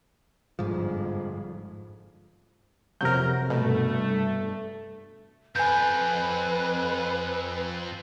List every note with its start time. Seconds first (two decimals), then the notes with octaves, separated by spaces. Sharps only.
0.59 G1 F2 G#2 F3
3.01 F2 C3 F#3 A#4 G6
3.50 G2 B2 A3
5.56 F2 B4 G#5 G6